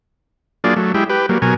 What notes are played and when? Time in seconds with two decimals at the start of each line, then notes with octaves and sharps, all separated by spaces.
0.64 F#3 A#3 D4 F4 G#4 D5
0.77 F#3 A3
0.94 G#3 E4 G4
1.10 G4 B4
1.29 F#3 G3 A#3
1.42 B2 F#3 A#4 G#5